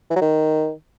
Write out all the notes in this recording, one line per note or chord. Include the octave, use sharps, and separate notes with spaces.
E3
F#3
D#3